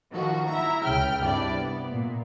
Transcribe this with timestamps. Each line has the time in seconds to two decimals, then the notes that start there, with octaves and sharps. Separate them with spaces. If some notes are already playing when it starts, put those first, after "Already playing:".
0.10 D#3 F3 F#4
0.48 E4 E5 A#5
0.84 C#2 C#3 G5 F6
1.23 G2 C3 D4 E4 D5
1.57 B3
1.91 A#2